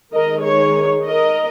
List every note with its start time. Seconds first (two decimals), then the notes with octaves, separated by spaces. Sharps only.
0.12 D#3 G#3 D#4 A#4 D#5
0.43 G#4 C#5
1.05 A#4 D#5